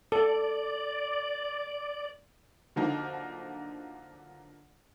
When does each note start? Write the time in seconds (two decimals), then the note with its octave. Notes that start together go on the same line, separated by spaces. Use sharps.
0.12 A4 D5
2.76 D3 F3 F#3 A#3 D#4